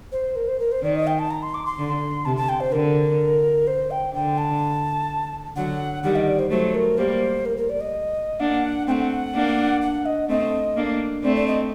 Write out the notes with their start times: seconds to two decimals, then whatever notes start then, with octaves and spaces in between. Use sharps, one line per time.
0.12 C5
0.36 A#4
0.48 C5
0.60 A#4
0.72 C5
0.83 D#3 D5
0.95 D#5
1.07 G5
1.19 A5
1.31 A#5
1.43 C6
1.54 D6
1.66 C6
1.79 D3
2.25 C3 A5
2.37 A5
2.49 G5
2.60 C5
2.72 D3 A#4
3.67 C5
3.91 G5
4.14 D3 G5
4.38 A5
5.56 D3 F#3 F#5
6.03 D#3 G3 F#5
6.16 D#5
6.27 D5
6.39 C5
6.50 F#3 A3 C5
6.74 A#4
6.98 G3 A#3 C5
7.45 A#4
7.57 A#4
7.69 D5
7.81 D#5
8.40 A#3 D4 F#5
8.87 A3 C4 G5
8.91 F#5
9.35 A#3 D4
9.82 F#5
10.06 D#5
10.29 A3 C4 D#5
10.77 A#3 D4
11.24 A3 C4 D5
11.36 D5
11.47 D#5